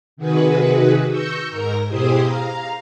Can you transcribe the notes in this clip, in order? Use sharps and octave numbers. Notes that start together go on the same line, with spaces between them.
C3 D#3 F#4 G#4 B4
C#6 E6 G6 A#6 C#7
G#2 A#4 A#5
B2 E4 G4 G#4 C5 D#6
F5 A#5